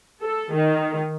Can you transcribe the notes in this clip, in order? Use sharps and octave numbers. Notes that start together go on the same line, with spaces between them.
A4
D#3